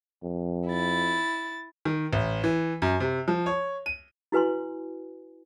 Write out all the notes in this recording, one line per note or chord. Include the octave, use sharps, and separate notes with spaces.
F2
E4 A6
D#3
A1
E3
F#2
C3
F3
C#5
D#7
E4 F#4 B4 G#5 C6